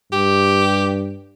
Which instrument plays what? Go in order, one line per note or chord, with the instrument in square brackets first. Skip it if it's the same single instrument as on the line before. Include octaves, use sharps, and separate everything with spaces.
[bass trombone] G2 [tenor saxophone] G4